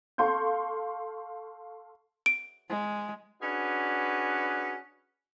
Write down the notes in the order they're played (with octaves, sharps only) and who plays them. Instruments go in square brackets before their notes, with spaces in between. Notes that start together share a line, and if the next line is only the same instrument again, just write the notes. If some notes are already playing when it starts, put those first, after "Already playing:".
[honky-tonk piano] A4 F5 C6 C#6 G6
[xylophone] D7
[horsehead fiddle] G#3
[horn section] C#4 D4 F#4 G#4 B4